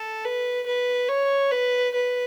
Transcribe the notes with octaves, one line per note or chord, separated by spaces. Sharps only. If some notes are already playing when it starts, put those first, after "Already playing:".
Already playing: A4
B4
B4
C#5
B4
B4